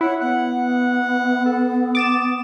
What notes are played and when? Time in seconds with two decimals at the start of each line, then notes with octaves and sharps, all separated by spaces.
0.01 E4 C#5 F#5
0.21 B3 F#5
1.46 A4
1.95 D6 D#6 A6 E7